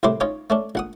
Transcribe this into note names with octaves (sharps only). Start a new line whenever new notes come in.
C2 A2 C4 E4 C6 D6
C#4 D#4 F4 C#5
A3 C#4 D4
A#1 F#5 D#6